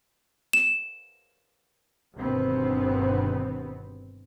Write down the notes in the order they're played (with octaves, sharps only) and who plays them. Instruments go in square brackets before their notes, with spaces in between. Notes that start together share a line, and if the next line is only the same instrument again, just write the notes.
[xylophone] E7
[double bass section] G1 B2 D#3 B3 C4